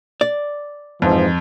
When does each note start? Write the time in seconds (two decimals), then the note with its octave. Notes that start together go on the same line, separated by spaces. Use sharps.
0.21 D5
1.02 F2 G#2 E3 F3